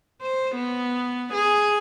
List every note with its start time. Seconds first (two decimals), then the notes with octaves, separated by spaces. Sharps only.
0.22 C5
0.55 B3
1.34 G#4